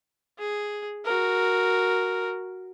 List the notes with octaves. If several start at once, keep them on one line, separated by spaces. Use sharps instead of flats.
G#4
F#4 A#4